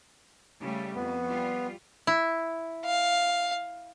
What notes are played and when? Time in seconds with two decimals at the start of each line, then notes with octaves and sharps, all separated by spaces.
0.60 C#3 G3 A3
0.95 F2 B3
1.27 G3 F4
2.07 E4
2.85 F5